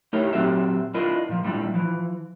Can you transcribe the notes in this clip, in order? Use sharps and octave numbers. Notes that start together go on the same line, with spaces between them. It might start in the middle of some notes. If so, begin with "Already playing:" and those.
A3 D#4 E4 G4 A#4 C#5
A#2 F#3 C4 F#4 G4 E5
D4 E4 F4 A#4 B4 D#5
A#2 F3
A#2 G3 G#3 D4 E4
E3 F3